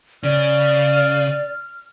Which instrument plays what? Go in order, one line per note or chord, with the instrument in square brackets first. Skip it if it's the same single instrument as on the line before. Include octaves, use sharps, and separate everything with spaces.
[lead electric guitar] C#3 [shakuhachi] D5 [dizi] F6